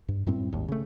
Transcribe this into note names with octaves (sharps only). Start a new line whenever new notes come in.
G2
F#2 A2 G3 C4
G#1 D#2
C#3 A3